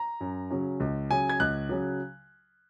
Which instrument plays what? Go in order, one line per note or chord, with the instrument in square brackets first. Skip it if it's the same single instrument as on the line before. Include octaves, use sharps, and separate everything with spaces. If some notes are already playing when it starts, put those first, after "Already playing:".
Already playing: [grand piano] A#5
F#2
C#3 F#3 C#4
C#2
C#3 F#3 G#5
G#6
C#2 F#6
C#3 F#3